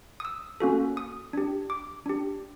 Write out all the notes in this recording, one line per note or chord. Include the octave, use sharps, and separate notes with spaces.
D#6
E6
A#3 C#4 F#4 A4
D#6
D4 G4
D6
D4 G4